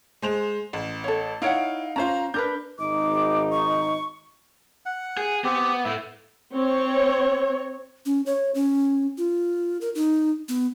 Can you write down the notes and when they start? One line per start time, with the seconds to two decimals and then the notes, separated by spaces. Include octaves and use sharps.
0.22 G#3 C5 F7
0.73 A1
1.04 A4 C#5
1.42 D#4 E4 C#5 F5 F#5 D7
1.96 C#4 F4 C5 A#5
2.34 D4 A#4 B4 G6
2.79 G#1 D#4 D6
3.51 C#6
4.86 F#5
5.17 G#4
5.44 B3 C4 G4
5.85 A2 A3 E4
6.54 C4 C#5
8.06 C#4
8.26 C#5
8.55 C#4
9.18 F4
9.81 A#4
9.95 D#4
10.49 B3